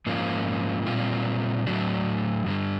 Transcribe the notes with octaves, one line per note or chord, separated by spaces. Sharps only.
G#2 F3 A#3 C#4 F4
A#2 G3 C4 F4
A2 F#3 A3 D4 F#4
G2 D3 G3